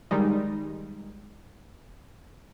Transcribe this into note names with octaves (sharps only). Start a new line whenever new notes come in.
D#3 G3 G#3 D#4